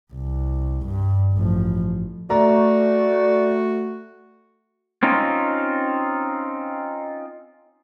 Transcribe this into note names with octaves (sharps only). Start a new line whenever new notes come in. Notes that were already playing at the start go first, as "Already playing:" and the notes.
C2
G2
A1 F3
A3 F#4 D5 A#5
C4 C#4 D#4 F4